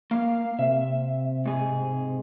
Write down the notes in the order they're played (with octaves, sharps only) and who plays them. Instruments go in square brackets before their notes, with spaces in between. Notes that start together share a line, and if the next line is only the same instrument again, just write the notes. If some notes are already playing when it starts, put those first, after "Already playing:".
[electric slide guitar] A#3 [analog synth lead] F5
[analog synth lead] C3 [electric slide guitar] E5
[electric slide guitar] G#2 G#4